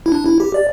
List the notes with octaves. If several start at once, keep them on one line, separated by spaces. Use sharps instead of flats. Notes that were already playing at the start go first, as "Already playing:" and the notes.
E4
D4
E4
G4
D5